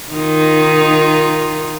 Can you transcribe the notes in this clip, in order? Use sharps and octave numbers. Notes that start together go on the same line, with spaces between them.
D#3 D#4 F4